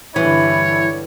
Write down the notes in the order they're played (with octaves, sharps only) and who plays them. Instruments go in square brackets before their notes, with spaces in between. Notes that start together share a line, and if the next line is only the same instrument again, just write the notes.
[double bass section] G2 D3 G3 [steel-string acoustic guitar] E3 [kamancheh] E4 [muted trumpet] C#5